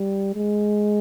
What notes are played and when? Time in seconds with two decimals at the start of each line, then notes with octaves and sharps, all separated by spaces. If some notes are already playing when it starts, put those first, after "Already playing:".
Already playing: G3
0.35 G#3